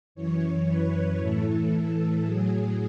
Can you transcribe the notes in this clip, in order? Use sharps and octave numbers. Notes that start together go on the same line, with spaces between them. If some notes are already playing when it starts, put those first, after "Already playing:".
F#2 E3 C#5
B4
A2 E3 A4
A2 F#3 G#4